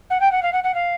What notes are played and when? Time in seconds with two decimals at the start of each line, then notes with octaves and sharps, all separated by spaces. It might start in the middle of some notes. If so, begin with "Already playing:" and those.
0.10 F#5
0.21 G5
0.31 F#5
0.43 F5
0.53 F#5
0.64 F#5
0.74 F5